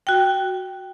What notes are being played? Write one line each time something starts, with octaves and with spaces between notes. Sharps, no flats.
F#4 G5